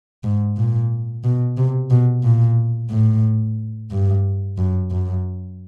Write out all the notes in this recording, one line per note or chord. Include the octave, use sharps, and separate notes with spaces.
G#2
A#2
B2
C3
B2
A#2
A2
G2
F#2
F#2